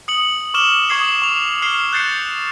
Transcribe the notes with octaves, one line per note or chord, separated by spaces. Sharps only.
D#6 C#7 F#7
C#6 D6 F6 E7 G7
C#6 D#6 G#6 C7 F#7
C#6 F7
F6 C7 F7 G7
F#6 G6 A6 C7 C#7